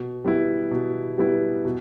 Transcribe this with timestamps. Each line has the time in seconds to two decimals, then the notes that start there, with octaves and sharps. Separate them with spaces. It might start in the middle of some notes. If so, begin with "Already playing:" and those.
Already playing: B2
0.25 G3 B3 E4
0.71 B2
1.18 G3 B3 E4
1.65 B2